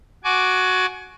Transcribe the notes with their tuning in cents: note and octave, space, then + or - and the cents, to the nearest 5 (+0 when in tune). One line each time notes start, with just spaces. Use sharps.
F#4 +0 G#5 +25 D6 +0